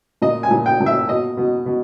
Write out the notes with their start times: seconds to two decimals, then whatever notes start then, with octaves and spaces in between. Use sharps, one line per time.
0.22 A#2 D#5
0.43 G#5
0.51 A#2
0.66 G5
0.80 A#2
0.86 E5
1.08 B2 D#5
1.37 B2
1.66 B2